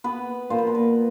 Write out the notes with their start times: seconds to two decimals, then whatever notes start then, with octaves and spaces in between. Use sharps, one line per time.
0.04 B3 B4
0.50 A#2 C5
0.58 B4
0.67 A#4
0.75 B4